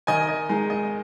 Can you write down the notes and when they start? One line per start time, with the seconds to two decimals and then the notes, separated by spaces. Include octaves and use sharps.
0.07 D#3 D#5 G#5
0.29 D#5
0.49 G#3 D#4
0.70 D#5